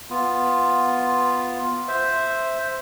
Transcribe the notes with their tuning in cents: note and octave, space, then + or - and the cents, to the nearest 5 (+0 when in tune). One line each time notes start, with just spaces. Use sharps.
B3 +0 F4 +0
C5 +0 E5 +0